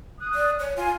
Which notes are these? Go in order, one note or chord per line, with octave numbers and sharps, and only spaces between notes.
D#6 F#6
D5
C#5
F4 G#5